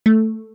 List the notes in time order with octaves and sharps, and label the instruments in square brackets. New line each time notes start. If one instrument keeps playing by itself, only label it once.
[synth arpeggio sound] A3